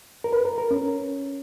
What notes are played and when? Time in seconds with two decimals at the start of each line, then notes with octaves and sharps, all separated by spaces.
0.24 A#4
0.33 B4
0.45 A#4
0.58 A#4
0.71 C#4